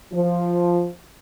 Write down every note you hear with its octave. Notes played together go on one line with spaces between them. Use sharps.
F3